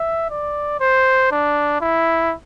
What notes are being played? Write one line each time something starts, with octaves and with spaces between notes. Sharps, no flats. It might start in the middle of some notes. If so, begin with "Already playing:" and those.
Already playing: E5
D5
C5
D4
E4